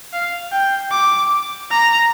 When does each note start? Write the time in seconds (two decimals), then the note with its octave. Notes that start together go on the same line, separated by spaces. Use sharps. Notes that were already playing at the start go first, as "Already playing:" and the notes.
0.13 F5
0.52 G5
0.92 D6
1.71 A#5